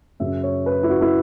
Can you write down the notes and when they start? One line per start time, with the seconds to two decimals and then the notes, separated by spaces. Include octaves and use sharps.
0.20 F#2 C#3 F#3 E5
0.43 C#5
0.66 B4
0.83 E4
0.89 F#4
1.01 E4